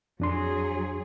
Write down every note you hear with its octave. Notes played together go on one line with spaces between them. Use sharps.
F2 F#3 D4 G#4 C6